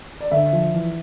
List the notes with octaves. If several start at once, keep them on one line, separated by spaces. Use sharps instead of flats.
D5
D3 E5
F3
E3